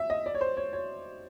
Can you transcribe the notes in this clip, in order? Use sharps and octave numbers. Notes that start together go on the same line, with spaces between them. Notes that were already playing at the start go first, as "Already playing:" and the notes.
Already playing: E5
D#5
D5
C#5
C5
C#5
C#5